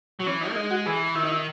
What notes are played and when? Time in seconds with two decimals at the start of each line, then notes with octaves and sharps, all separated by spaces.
0.20 F#3
0.26 E3 C#4
0.41 D#4
0.50 A#3
0.55 G#3 D#4
0.71 F#4
0.86 E3 G#4
1.15 D#3 E4
1.23 D#4
1.31 E4